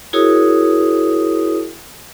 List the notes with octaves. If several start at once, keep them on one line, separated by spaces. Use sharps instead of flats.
E4 F#4 G#4 A#4 C#5 D#6